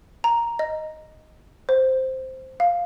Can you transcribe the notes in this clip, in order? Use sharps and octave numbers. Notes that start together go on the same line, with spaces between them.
A#5
D#5
C5
F5